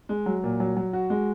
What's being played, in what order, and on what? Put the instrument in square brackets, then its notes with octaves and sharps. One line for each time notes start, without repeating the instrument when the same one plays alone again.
[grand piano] G#3
F#3
A#2
F#3
F#3
F#4
G#3